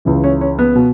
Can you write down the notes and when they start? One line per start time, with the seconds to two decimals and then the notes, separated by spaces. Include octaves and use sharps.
0.05 C#2 C#3 E3
0.24 C#4
0.41 C#4
0.59 B3
0.75 B2